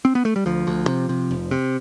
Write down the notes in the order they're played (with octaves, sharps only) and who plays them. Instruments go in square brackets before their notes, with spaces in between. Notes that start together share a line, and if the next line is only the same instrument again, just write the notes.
[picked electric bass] C4
B3
A3
G3
D2 F3
D2
C3
C3
F1
C3